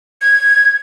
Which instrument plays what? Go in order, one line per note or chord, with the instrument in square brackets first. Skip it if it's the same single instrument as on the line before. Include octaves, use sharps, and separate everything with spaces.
[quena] G#6